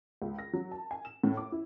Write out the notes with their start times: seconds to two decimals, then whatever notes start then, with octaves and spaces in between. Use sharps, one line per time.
0.22 C#2
0.39 A#6
0.53 F#3
0.71 A5
0.91 G#5
1.05 E7
1.23 A2
1.37 D6
1.52 E4